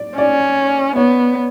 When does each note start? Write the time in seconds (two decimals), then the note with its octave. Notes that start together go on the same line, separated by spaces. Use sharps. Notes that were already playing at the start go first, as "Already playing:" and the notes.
Already playing: D5
0.17 C#4 D5
0.96 B3 C#5